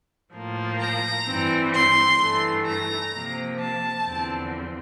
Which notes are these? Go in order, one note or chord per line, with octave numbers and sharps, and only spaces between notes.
A2 F3 A#3
A#5
G2 E3 G3 C4
C6
G2 E3 A3
A#5
C3 F3 A#3
A5
E2 D3 F3 C4